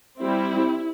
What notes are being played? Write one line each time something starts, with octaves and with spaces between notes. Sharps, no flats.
G3 C4 E4